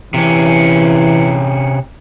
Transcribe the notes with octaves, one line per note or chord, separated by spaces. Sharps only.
C3 E3 C#4